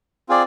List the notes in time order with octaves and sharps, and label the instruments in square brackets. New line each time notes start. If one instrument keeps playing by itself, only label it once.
[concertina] C4 F4 G#4 D5